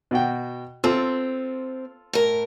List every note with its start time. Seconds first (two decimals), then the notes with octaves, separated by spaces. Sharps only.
0.11 B2 F#4 G5
0.84 C4 F4 A4 C6
2.13 A2 A#4